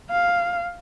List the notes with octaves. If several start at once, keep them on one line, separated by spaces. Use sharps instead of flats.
F5